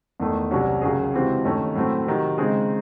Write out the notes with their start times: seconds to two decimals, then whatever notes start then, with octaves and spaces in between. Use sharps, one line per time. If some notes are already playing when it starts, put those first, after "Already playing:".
0.20 E2 D#3 A3
0.51 C2 C3 F#3 C#4 F#4
0.82 D#2 C#3 F#3 C#4 G#4
1.13 C#2 C3 E3 C4 F#4
1.45 D#2 D#3 A3 C#4
1.75 A2 F#3 A3 C4
2.07 C3 D#3 F#3
2.38 C#3 G#3 C4 D#4 G#4